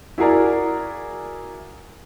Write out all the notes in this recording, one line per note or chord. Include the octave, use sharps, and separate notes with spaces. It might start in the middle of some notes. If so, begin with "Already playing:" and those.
E4 F#4 G#4 A#4 D5